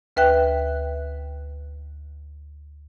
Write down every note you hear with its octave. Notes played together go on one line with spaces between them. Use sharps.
D2 B4 E5 G5 F#6